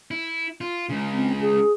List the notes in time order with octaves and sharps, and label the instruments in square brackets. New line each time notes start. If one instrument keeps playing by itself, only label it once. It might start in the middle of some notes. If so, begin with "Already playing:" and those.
[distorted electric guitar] E4
F4
C#2 C#3
[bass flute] C4
G#4